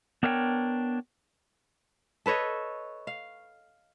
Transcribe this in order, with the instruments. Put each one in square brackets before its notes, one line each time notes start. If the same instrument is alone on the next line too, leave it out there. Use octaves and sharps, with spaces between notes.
[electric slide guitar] B3 D4 A#4 C#5 F5 G5
[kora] A4 B4 C#5 D#5
F5